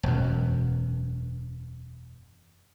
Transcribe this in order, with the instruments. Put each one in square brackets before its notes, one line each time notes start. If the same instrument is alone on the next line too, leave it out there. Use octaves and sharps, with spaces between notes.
[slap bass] E1 F#2